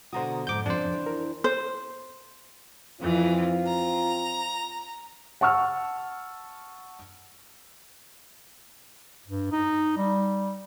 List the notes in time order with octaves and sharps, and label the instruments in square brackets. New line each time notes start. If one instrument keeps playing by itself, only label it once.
[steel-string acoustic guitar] B2 D3 F#4 [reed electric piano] C5 A#5 D#6
[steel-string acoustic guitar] F2 G#2 [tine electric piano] D6 G6
[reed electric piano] F2 A6 [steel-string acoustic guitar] C#3 C4 [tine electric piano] D4 C5
[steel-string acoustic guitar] E3
[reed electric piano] A#4
[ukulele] C5
[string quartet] F2 E3 [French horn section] C4 F4
[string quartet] A#5
[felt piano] F#5 A5 C#6 E6 F6
[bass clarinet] G2
D#4
G3